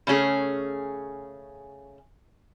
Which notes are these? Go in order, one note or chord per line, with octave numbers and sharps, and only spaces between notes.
C#3 A3 C#4 G#4